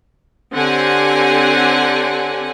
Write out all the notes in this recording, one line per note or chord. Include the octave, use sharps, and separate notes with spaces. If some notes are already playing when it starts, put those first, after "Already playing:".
D3 C4 G4 C#5 F#5 G#5